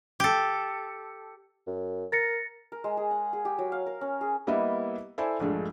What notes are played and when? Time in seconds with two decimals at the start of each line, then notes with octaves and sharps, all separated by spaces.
0.20 G4 A4
1.67 F#2
2.12 A#4 A6 A#6 C#7
2.72 A#4
2.84 G#3
2.97 G#4
3.11 F#5
3.33 G#4
3.45 G4
3.59 F#3
3.72 F5
3.86 A#4
4.01 C#4
4.21 G#4
4.47 G3 A#3 B3 E4 D#5 E5
5.18 E4 A4 C5 D5 G#5
5.40 A#1 G2 G#3 A3